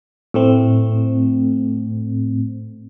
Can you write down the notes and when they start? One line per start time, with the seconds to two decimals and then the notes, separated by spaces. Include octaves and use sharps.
0.34 A2 A3 C4